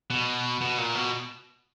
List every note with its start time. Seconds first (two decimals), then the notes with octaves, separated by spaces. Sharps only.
0.10 B2
0.61 B2
0.78 A#2
0.95 B2